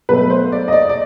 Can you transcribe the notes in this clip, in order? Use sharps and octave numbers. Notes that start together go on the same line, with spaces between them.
B2 F#3 A3 B4
C5
D5
D#5
D5
D5